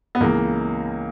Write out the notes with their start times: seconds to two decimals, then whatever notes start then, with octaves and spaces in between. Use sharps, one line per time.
0.15 B3
0.20 C#2 C#3 E3 A#3